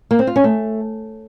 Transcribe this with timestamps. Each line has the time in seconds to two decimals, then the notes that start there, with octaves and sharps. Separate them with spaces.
0.11 A#3
0.19 C4
0.27 F4
0.36 C#4
0.44 A3